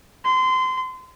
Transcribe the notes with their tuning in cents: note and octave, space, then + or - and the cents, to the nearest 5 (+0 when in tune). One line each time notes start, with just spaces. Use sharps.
C6 -25